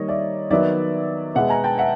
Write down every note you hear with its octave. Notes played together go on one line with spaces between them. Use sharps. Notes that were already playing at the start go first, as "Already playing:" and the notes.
Already playing: D#3 G3 A#3 C#5 D#5
D5 E5
D#3 F#3 B3 D5 E5
B2 G#3 B3 E5 F#5
G#5 A#5
G5 A5
E5 F#5